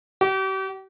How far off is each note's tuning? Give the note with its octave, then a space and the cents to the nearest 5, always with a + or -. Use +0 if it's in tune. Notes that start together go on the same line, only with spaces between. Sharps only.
G4 -40